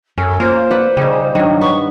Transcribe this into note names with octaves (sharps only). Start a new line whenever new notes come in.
F#2 C#4 A4
A#3 F4 C5
B4 D5 F#5
C#3 G3 D#4
G2 D#3 F#3
B3 C#6